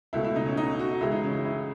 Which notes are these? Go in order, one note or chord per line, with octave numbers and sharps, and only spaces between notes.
C#2 B2 A3 E4
E4
D#4
C#4
D#4
F#4
C#2 C#3 E3 G#3 E4
D#4
C#4
E4
E4